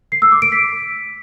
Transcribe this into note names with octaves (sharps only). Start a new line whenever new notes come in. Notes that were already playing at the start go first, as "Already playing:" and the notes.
C7
E6
D6
D7
B6